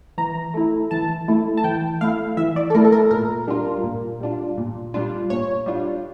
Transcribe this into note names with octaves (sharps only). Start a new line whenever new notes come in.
E3 A#5
A3 E4
E3 A5
A3 E4
A5
E3 G5
A3 E4 F5
E3 E5
D5
A4
A3 E4 A#4
A4
A#4
A#2 A#4
G3 D4 F4
A#2
G3 D4 F4
A#2
G3 D4 F4
A#2 C#5
G3 D4 F4